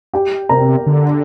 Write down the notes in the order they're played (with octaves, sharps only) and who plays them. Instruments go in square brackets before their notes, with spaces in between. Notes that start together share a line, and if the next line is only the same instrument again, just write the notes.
[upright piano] G4 G5
[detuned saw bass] C3 [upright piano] A#4 A#5
[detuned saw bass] D3